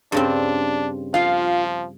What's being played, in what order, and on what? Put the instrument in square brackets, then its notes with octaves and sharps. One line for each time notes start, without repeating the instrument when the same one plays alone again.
[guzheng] G2 C#3 C4 [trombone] D4
[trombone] F3 [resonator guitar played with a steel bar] F4 F5